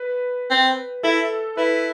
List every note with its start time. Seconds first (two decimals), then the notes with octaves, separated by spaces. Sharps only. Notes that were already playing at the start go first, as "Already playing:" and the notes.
Already playing: B4
0.51 C4
1.03 E4 A4
1.57 E4 B4